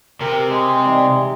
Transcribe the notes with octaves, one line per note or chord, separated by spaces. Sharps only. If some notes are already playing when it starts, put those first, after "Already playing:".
C3 G4 A#4
G#3
E3 G3 D#4